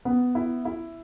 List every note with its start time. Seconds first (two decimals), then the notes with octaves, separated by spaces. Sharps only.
0.05 B3
0.35 E4
0.65 E4